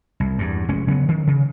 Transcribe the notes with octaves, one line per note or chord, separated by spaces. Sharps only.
C2
E2 G2
F1 G#3 C#4
C#3 F#3 A#3 B3
D#3
C#3